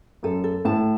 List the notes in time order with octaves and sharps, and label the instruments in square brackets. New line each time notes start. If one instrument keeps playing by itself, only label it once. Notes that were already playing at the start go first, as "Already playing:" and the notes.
[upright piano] F#2 [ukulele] A4
[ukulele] A4
[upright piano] A2 [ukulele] A5